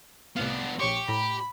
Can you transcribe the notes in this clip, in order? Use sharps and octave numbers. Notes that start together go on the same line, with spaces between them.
C2 A2 B3 D4 F5
A#1 G4 C#5 C6 C#6
A2 A#5 B5